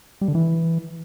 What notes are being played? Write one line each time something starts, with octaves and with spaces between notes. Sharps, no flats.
G3
D3
E3